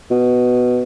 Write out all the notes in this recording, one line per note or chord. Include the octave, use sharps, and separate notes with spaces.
B2